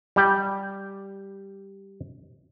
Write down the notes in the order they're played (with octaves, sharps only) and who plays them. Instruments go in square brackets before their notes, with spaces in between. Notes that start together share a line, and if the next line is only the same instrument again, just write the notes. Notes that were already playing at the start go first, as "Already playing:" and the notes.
[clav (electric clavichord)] G3 G4